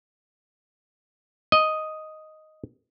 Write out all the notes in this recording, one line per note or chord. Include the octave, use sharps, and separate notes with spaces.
D#5